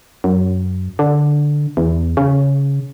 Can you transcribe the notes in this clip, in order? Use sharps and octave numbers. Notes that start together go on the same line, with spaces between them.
F#2
D3
E2
C#3